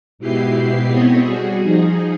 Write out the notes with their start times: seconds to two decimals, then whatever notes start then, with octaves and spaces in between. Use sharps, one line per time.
0.19 G#2 B2 E4 G4 B4 C7
0.88 B3 C4 A4 B4 C#5 D#5
1.21 G3 F#4 G#4
1.61 F3 D#4 G#4